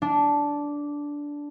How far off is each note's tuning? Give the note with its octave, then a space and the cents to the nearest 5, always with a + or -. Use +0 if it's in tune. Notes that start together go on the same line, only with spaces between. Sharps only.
D4 -10